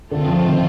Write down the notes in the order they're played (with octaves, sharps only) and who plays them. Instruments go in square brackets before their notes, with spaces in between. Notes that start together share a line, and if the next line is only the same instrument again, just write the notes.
[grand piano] D3 [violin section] A3 C4 F4
[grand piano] F3
D#3